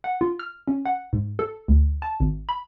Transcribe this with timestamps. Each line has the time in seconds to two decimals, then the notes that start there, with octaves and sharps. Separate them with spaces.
0.04 F#5
0.21 F4
0.39 F6
0.67 C#4
0.86 F#5
1.13 G#2
1.39 A4
1.68 D2
2.02 A5
2.20 G#1
2.49 B5